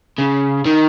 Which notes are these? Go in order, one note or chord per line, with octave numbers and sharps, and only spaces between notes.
C#3
D#3